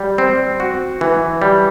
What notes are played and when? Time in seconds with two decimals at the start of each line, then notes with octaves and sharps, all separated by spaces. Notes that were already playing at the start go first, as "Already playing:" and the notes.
Already playing: G3
0.18 C4
0.60 F#4
1.01 E3
1.42 G3